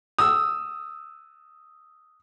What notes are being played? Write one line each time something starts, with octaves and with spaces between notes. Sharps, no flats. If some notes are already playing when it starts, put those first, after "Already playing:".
D#6 E6